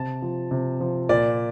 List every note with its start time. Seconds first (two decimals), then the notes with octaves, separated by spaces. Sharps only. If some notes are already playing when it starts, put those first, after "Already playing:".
Already playing: C3 A5
0.22 F3
0.51 C3
0.81 F3
1.09 A#2 D5